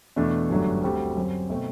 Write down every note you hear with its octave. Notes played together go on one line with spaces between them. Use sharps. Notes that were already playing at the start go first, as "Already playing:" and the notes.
E2 B2 A3 D4
G1 F#2 F#3 A3 D4
D2 D3 G3 C4 F#4
F#2 F#3 C4 G4
B2 A3 C4